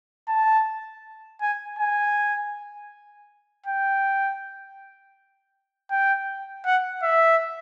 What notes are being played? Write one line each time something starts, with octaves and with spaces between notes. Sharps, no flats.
A5
G#5
G#5
G5
G5
F#5
E5